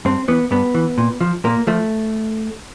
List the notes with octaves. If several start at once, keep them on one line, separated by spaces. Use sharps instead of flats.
G2 C4
E3 B3
G2 B3
E3
A#2
F3
A#2 A#3
F3 A3